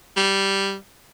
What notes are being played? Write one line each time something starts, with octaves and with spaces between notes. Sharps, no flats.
G3